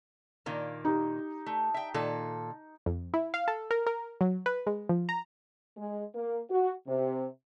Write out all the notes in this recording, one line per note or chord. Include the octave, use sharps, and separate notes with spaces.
A#2 D#3 A#3
D#4 G4
A3
E5 G5
A#2 D#3 A4
F2
E4
F5
A4
A#4
A#4
F#3
B4
G#3
F3
A#5
G#3
A#3
F#4
C3